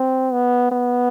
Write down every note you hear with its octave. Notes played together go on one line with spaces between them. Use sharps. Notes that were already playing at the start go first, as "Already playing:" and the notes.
Already playing: C4
B3
B3